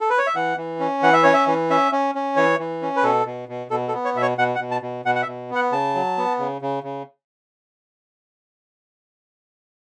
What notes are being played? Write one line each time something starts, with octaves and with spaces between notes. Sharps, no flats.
A4
B4
C#5
E5
E3 F#5
E3
C#4
E3 F#5
E5
C#4 C#5
E5
E3
C#4 E5
C#4
C#4
E3 C#5
E3
C#4
B4
B2 A4
B2
B2
B2 A4
A4
B3
C#5
B2 E5
C#5
B2 F#5
F#5
B2
A5
B2
B2 F#5
F#5
E5
B2
B3 F#5
C#3 A5
F#3
B3
C#3
C#3
C#3